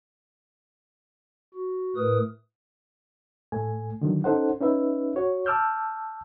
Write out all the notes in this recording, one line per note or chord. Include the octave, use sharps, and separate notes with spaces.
F#4
A2 A3 A#4 B4 D#6
A2 A3 G#5
D3 D#3 F#3
C#4 D#4 A4 C5 F#5
C#4 D#4 B4 E5
F#4 C#5
A5 D6 E6 F6 G6